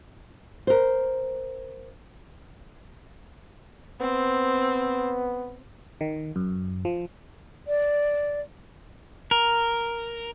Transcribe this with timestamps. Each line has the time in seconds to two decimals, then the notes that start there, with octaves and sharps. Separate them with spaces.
0.67 A#4 C5
4.01 B3 C4
6.01 D#3
6.36 F#2
6.85 F3
7.67 D5
9.31 A#4